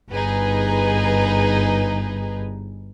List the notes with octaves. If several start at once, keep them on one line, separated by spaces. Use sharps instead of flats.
G1 D#4 G#4 B4